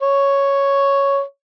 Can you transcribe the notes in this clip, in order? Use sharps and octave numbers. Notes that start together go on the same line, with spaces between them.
C#5